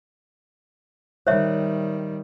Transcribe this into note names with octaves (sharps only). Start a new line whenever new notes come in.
D#3 G3 C5 C#5 E5